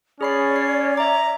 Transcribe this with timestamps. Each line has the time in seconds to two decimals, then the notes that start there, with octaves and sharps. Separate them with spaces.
0.21 C#4 G#4 C#5 D5 B5 C7
0.56 C7
0.97 E5 A#5 D6